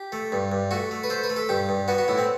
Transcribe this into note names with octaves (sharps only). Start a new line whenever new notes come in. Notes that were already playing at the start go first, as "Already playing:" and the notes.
Already playing: G4
A3
G2
G2
A3 F#4
A3
B4
A3 C5
B4
A3
A4
G2 G4
G2
B3 F#4
F#4
A2 E4
C4